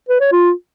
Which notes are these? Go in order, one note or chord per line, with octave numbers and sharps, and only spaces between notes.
B4
C#5
F4